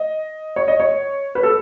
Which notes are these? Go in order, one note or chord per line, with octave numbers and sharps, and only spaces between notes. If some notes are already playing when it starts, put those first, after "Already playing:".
Already playing: D#5
C#5
D#5
C#5
B4
A4